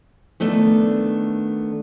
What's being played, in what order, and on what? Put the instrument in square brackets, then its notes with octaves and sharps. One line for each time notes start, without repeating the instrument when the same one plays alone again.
[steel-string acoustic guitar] D#3 A3 B3 D4